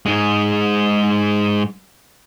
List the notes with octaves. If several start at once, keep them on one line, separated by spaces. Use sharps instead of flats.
G#2 G#3